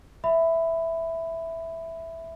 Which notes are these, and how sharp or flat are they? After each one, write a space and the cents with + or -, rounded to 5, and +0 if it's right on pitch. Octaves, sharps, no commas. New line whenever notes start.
E5 +0 B5 +15